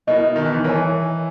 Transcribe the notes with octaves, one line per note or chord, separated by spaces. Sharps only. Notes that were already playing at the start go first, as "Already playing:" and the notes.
B2 E4 A#4 D#5
D#3
E3
D#3
E3 A#4 C#5 G#5